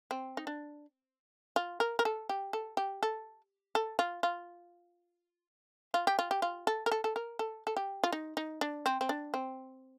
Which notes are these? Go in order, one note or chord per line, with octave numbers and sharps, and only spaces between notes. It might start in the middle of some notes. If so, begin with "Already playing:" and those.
C4
D#4
D4
F4
A#4
A#4
A4
G4
A4
G4
A4
A4
F4
F4
F4
G4
F4
G4
F4
A4
A#4
A4
A4
A#4
A4
A4
G4
F4
D#4
D#4
D4
C4
C4
D4
C4